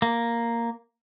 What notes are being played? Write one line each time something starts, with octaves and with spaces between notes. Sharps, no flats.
A#3